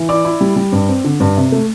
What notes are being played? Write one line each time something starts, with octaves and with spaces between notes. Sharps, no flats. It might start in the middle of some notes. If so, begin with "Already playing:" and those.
Already playing: E3
E4 D5 D6
E4
G3
G3
G2
C4
D3
G2
C3
A3